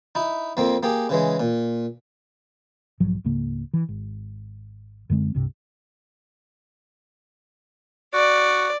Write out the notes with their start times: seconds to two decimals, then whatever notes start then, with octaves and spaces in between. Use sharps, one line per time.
0.15 D#4 E4
0.57 F2 A#3 C4
0.83 A#3 G4 G#4
1.09 C#3 E3 G#3
1.40 A#2
3.00 B1 G#2 F3 F#3
3.24 C#2 G#2 C#3 A#3
3.73 E3
3.89 G#1
5.10 F#2 D3 G#3 C4
5.34 C2 G2 C3
8.14 F#4 D5